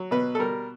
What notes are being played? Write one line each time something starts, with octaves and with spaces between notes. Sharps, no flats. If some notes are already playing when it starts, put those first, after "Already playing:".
Already playing: F#3
B2 B4
A4
G3 A#4